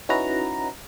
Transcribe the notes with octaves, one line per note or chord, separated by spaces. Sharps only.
C#4 D#4 E4 F#4 B4 A#5